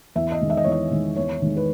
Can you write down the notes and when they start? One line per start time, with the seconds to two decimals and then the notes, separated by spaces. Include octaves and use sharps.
0.16 E2 E5
0.32 D#5
0.40 D#3 G#3
0.50 E5
0.57 D#5
0.64 E2 C#5
0.72 D#5
0.92 D#3 G#3
1.16 E2 C#5
1.42 D#3 G#3
1.57 B4